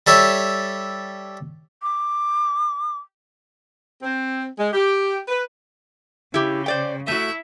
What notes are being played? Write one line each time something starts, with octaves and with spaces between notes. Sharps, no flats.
G3 A4 C#5 E5
D6
C4
G#3
G4
B4
C#3 E4 G4
C5 D5 G5
A3 E4 F#4 E5